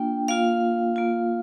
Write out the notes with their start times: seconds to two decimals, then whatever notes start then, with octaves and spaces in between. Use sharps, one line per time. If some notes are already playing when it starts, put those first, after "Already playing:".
Already playing: A#3 D4 F4 G5
0.28 A#3 F4 F5
0.96 A#3 F4